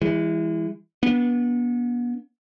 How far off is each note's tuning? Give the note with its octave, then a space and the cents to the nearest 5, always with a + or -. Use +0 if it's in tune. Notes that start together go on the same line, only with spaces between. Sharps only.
E3 +0 G#3 -35
B3 -35 D4 -30